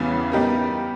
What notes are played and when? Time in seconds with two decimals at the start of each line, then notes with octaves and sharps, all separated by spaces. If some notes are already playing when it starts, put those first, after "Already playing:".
Already playing: E2 C#3 E3 G3 B3
0.31 G3 B3 D#4 G4 A#4